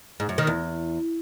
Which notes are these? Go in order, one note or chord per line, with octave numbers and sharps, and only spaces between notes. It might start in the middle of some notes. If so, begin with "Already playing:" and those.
G#2
F#2
D#3
E2